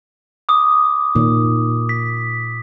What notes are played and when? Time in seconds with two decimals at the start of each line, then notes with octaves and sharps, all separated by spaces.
0.49 D6 D#6
1.15 A#2 D#3
1.89 B6